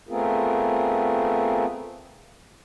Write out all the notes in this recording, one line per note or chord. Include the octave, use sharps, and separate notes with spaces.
A3 B3 C4 F4 G#4 A#4